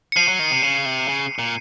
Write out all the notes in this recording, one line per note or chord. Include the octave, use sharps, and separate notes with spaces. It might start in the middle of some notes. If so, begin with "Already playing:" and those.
C#7
F3 C7 D#7
F#3
D#3
C3
C#3
C3
C#3
A#2